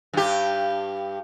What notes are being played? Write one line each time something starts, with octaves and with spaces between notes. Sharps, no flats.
G2 G4